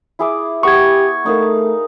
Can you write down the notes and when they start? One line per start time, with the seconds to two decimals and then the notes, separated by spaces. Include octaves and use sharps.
0.19 E4 G#4 D6
0.63 B3 G4 C#6 G#6
1.26 A3 D#4 A#4 F5